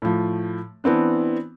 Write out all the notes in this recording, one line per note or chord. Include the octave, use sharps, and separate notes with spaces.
A2 F3
E3 B3 C4 D4